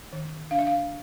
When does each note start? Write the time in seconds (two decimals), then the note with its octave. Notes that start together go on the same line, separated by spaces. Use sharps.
0.13 D#3
0.51 D4 F5
0.59 E5
0.67 F5